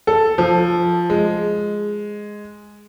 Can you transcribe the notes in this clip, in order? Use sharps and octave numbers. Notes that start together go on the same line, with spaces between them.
A4
F3
G#3